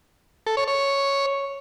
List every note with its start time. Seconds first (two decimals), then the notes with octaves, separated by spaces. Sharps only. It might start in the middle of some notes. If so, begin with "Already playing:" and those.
0.47 A4
0.57 C#5
0.68 C#5